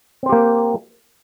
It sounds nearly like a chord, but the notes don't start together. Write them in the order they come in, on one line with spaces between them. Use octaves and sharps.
C4 C5 G4 A#3